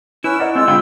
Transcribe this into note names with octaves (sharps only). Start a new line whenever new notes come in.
C#4 E4 B4 E6
A#4 D5 D#5 F#5
G#3 C4 F4 E6
F1 D3 G#3 E4 F4 G5 B5